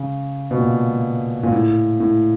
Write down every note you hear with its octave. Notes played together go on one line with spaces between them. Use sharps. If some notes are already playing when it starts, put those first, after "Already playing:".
Already playing: C#3
B2
A#2
A#2
A2
A2